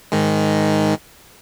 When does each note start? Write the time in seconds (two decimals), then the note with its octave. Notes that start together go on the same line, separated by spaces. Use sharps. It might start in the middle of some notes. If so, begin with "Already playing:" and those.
0.12 G#2 D#3 G#3